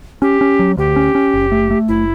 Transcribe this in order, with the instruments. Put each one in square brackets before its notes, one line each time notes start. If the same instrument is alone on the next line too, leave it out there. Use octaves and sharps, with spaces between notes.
[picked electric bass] C#4 [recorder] G4
[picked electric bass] C#4
F#3
[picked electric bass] D2 [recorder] G4
[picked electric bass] C#4
C#4
F#1
A3
A3
[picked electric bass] F#1 [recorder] E4